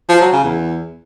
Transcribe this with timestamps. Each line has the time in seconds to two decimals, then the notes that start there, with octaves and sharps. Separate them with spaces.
0.09 F3
0.21 F#3
0.32 C#3
0.44 E2